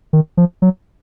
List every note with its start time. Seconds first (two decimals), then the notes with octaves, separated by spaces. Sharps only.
0.13 D#3
0.37 F3
0.62 F#3